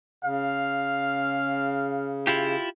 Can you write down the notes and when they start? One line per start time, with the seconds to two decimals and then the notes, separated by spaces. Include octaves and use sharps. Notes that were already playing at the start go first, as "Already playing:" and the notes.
0.24 C#3 F5
2.27 E4 F4 G4